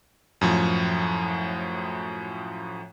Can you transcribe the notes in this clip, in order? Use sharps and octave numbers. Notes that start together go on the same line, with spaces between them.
F#2 A2 F3